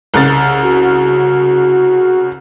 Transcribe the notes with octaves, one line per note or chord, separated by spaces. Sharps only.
C2 C#3 A6
F#4